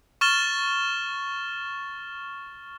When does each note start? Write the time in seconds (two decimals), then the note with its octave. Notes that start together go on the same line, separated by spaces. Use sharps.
0.21 C#6 F6 A6 E7 G7